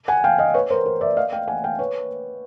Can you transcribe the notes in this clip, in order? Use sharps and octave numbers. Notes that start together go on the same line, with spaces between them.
F#5 G#5
F5 G5
D#5 F5
B4 C#5
A#4 C5
A#4
D5 E5
D#5 F5
F5 G5
F#5 G#5
F5 G5
B4 C#5